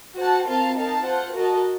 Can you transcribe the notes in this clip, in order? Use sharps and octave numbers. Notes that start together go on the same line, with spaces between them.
F#4 C5 F#5 A5
C4 F4 A#4 F5 A5
D#4 A#4 F5 A5
F4 C5 F#5
F#4 A#4 D#5 A5